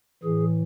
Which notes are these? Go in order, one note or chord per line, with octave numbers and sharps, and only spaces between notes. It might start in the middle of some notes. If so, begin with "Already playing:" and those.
A2 E3 G#4